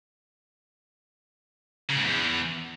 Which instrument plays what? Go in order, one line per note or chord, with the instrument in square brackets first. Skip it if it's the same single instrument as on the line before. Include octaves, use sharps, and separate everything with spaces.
[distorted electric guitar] C#3
G#2
E2